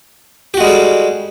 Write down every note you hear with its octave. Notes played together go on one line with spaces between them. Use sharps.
G3 G#3 F#4 G4 A4